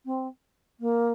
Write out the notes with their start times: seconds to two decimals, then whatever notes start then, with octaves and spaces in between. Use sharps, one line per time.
0.05 C4
0.80 A#3